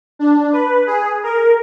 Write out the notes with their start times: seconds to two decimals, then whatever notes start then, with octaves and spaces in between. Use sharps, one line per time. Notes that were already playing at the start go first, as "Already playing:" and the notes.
0.19 D4
0.53 B4
0.87 G#4
1.23 A#4